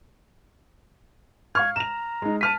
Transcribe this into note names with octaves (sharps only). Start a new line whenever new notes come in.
F5 C#6 F6 G#6
A#5 E7 F7
G#3 D#4
A5 F6 B6 D#7